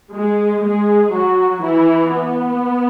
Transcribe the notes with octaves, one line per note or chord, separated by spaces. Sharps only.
G#3 G#4
G#3 G#4
F#3 F#4
E3 E4
B3